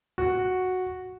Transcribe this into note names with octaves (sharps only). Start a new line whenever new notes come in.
F#4